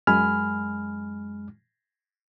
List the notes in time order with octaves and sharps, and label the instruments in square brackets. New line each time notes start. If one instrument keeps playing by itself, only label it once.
[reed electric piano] F#2 G#3 G#5 B5 F6